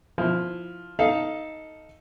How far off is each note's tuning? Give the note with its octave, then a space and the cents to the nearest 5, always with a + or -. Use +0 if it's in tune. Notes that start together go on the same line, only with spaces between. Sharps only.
F3 +0 E4 +0
D#4 +10 A4 +0 F5 -5